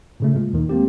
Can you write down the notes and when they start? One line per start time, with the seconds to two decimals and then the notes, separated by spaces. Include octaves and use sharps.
0.20 A#2 C#3 A3
0.36 A#2 G#3
0.53 D#2 D#3
0.69 G#3 A#3 C4 G4